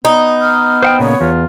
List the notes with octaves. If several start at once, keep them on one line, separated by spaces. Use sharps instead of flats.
B3 D#4
F6
C5 F#5 G5
A#2 C#3 C#5
E2 F4